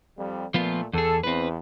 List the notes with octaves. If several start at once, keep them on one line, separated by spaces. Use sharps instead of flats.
F2 G3
A#2 F3 A3 B3 F4
E2 G#4 A4
E2 C4 B4